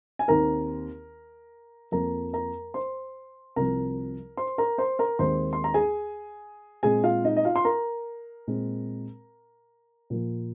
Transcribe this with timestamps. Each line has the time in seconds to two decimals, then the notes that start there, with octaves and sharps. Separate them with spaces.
0.19 G#5
0.28 D#2 D#3 C4 A#4 A#5
1.92 F2 F3 A#3 A#4 A#5
2.33 A#4 A#5
2.74 C5 C6
3.56 C2 C3 F3 C4 A#4 A#5
4.37 C5 C6
4.58 A#4 A#5
4.78 C5 C6
4.99 A#4 A#5
5.19 D#2 D#3 G#3 C4 C5 C6
5.53 C6
5.64 A#5
5.74 G#4 G#5
6.83 A#2 G#3 C4 G#4 G#5
7.04 F4 F5
7.25 D#4 D#5
7.36 D#5
7.45 F4 F5
7.56 C6
7.65 A#4 A#5
8.47 A#2 G#3 C4
10.10 A#2 F3 A#3